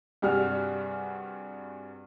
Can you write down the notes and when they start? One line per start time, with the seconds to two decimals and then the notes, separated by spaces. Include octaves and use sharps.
0.22 G2 C3 G3 F#4 G#4 F6